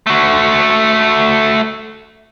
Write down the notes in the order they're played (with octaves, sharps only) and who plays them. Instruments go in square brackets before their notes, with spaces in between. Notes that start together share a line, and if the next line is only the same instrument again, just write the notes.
[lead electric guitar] A3 F#4